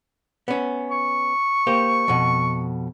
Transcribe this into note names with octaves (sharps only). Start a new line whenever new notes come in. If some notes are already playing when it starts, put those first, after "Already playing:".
B3 C#4
C#6
A#3 G4 C5
F2 B2